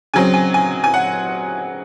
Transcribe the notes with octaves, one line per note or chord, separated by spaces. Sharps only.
C#3 F#3 C4 G#5
G#5
G#5
G#5
F#5